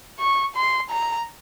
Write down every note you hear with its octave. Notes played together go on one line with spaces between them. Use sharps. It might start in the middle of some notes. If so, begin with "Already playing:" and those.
C#6
C6
A#5